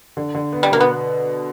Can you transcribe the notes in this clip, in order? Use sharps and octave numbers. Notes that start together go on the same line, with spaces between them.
D3
D3
B3
G3
B2 A#3
B3